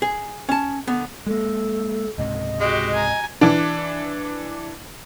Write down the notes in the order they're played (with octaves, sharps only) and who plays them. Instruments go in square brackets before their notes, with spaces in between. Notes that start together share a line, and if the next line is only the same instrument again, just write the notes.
[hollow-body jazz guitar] G#4
C#4 A5
D3 B3
[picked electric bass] G#3 A#3 [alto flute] A4
[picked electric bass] C#2 G#2 C3 [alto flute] D#5
[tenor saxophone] G#3 [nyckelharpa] F#4 G4
[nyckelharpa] G#5 A#5
[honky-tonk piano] E3 D4